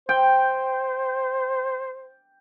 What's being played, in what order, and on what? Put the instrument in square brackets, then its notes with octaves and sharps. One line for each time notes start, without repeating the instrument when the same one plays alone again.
[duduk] C5 [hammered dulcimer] G5